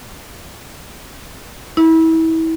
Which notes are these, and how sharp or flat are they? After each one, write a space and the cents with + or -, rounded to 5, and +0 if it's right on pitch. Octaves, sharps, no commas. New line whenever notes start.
E4 -30